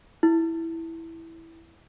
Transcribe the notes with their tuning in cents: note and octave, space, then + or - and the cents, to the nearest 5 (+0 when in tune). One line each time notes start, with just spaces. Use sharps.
E4 -5